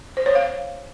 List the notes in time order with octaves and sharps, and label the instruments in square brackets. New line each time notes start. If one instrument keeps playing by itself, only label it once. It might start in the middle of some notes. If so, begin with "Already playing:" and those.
[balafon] C5
C#5
F5